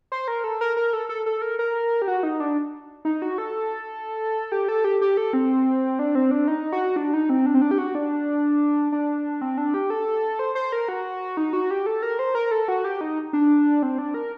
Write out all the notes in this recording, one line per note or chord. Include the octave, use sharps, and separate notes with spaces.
C5
A#4
A4
A#4
A#4
A4
A4
A4
A#4
A#4
G4
F#4
D#4
D4
D#4
F#4
A4
G4
A4
G4
G4
A4
C4
D4
C4
D4
D#4
F#4
D4
D#4
C4
D4
C4
D4
G4
F#4
D4
D4
C4
D4
G4
A4
C5
C5
A#4
F#4
D#4
F#4
G4
A4
A#4
C5
A#4
A4
F#4
G4
D#4
D4
C4
D4
A#4